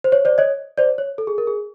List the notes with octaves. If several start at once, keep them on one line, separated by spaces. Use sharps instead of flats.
C5
C#5
C5 D5
C#5 D#5
C5 D5
C#5
A4
G#4
A#4
G#4